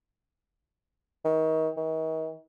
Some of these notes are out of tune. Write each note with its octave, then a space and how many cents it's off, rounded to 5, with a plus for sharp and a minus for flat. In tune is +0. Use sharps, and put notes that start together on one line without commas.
D#3 +30
D#3 +40